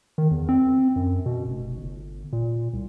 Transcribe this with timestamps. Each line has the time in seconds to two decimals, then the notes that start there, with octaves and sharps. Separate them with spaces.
0.18 D#3
0.31 E2
0.49 C4
0.96 F#2
1.26 B2
1.47 F1
1.78 G1
2.33 A#2
2.74 C2